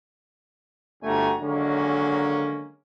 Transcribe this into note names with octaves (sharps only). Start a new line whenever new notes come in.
G1 G2 A3 F#4 G#5 A#5
D3 D#3 F#3 G#3 A#3 C#4